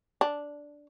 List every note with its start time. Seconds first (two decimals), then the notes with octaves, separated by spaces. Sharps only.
0.21 D4